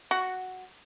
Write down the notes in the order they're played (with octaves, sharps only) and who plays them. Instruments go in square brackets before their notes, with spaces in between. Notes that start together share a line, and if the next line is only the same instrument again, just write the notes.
[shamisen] F#4